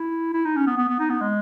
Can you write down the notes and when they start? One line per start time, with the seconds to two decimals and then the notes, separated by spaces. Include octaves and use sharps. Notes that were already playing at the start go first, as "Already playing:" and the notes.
Already playing: E4
0.34 E4
0.45 D#4
0.56 C#4
0.67 B3
0.78 B3
0.88 B3
0.99 D#4
1.10 B3
1.21 G#3